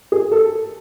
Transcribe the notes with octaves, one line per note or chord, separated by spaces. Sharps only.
G#4
A4